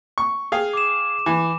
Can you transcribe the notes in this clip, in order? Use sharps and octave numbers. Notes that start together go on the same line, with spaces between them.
C#6
G#4 F5 G5
D6 E7
E3